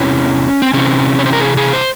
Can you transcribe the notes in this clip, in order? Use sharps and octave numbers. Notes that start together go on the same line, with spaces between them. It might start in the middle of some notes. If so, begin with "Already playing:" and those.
Already playing: E2 C3 E3 C#4
C4
C3 E3 C4 C#4
C#5
C5
A#4
G#4
G#4
C5